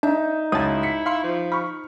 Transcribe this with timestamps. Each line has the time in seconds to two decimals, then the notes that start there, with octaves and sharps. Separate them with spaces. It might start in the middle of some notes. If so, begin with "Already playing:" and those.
0.03 D4 D#4 E5
0.52 C#2 C#4 E4 F#4 A5 D#6
0.83 B6 C#7
1.06 F5 C6 C#6
1.23 F3
1.52 B5 C#6 F6